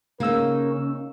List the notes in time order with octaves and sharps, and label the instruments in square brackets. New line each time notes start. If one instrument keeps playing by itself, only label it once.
[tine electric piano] C#3 E6 [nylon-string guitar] A#3 D#4 [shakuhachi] C#4 [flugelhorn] A#4